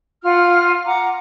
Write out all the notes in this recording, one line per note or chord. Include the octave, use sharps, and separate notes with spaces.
F4 F#5 F6
F#5 A#5 D6